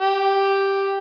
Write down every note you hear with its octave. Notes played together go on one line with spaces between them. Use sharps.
G4